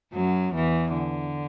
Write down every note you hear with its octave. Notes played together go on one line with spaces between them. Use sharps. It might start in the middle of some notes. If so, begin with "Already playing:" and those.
F#2 F#3
E2 E3
D3